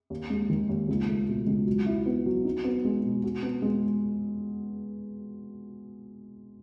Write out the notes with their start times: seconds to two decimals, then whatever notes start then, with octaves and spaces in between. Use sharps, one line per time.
0.10 D#2
0.30 G#3
0.50 D#3
0.69 D#2
0.88 C#2
1.09 A3
1.28 B2
1.47 C#2
1.66 F#3
1.86 E4
2.06 B3
2.26 F#3
2.44 D#4
2.65 B3
2.85 G#3
3.03 B2
3.24 F#4
3.43 B3
3.62 G#3